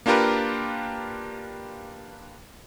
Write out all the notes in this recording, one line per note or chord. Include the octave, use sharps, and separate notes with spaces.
A#3 D4 F4 G4 A#4 B4